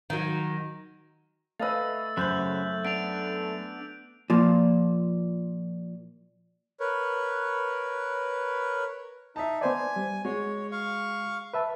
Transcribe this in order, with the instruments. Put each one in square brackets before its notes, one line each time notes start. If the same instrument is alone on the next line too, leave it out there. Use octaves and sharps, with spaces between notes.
[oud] D#3 F#3
[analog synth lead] A3 [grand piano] B4 D#5 F5 [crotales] E6 A6
[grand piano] F#2 C5 [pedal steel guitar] C#3 F#3 B5 [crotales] F#6 G6 F#7
[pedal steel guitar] B3 D4 [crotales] D7 F7
[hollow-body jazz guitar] A#2 F3
[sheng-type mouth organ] A#4 B4 C#5
[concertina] D#4 [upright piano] E5 A5
[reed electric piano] B3 C5 D5 [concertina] G#5
[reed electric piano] G3
[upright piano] G#3 [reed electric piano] F#4 [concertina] C#5
[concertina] F5 C#6
[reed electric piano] B4 E5 A5